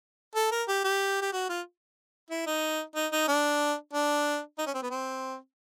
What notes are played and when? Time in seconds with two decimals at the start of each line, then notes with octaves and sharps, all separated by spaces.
0.36 A4
0.52 A#4
0.68 G4
0.84 G4
1.22 G4
1.33 F#4
1.49 F4
2.31 E4
2.47 D#4
2.95 D#4
3.12 D#4
3.28 D4
3.93 D4
4.58 D#4
4.66 C#4
4.74 C4
4.82 B3
4.91 C4